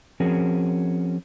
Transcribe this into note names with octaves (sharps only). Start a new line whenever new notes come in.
F3 C4 C#4 F#4 G#4 A#4